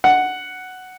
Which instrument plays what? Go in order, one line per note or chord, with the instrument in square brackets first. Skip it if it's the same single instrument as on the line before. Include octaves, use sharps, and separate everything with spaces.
[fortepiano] F#5